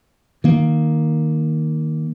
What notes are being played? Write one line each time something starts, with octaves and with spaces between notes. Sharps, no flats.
D#3 A#3